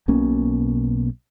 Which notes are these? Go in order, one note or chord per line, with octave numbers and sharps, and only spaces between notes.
B1 B2 A#3 C#4